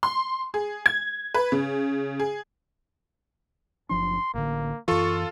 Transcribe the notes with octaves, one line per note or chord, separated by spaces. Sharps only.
C6
G#4
G#6
B4
C#3
G#4
F#1 F3 D4 C6
A1 D3 A#3
F#2 E3 F4 A4 C#6